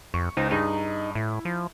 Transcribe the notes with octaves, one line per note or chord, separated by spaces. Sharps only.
F2 C#6
C#2 D#4 C5
G2 D#4 G#4 D#7
A2 E4
F3